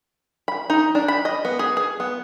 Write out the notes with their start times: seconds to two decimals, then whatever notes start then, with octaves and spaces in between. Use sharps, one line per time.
0.48 B5
0.70 D#4
0.95 D4
1.08 B5
1.25 D#5
1.45 B3
1.59 G#4
1.77 G#4
2.00 B3